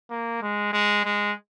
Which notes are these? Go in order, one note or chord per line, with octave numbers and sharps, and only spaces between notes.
A#3
G#3
G#3
G#3